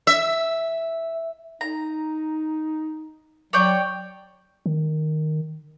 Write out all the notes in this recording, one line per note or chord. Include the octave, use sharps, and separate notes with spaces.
E5
D#4 A#5
F#3 C#5 D5 G5
D#3